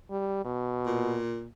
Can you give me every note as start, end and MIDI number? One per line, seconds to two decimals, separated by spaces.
0.11 0.43 55
0.45 1.19 47
0.85 1.47 46